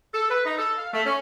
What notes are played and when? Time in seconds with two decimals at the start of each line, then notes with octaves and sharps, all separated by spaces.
0.13 A4
0.30 B4
0.45 D#4
0.59 A4
0.78 F5
0.94 A3
1.06 C#4